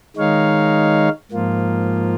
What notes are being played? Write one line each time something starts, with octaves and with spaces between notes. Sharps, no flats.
D#3 G#3 D#4 C#5 F5
G#2 F3 A#3 F4